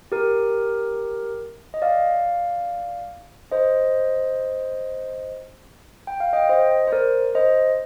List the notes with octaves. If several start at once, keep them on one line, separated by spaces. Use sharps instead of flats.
G4 A#4
D#5
D5 F5
C5 D#5
G5
F5
D#5 G5
C5 D#5
C5
A#4 D5
C5 D#5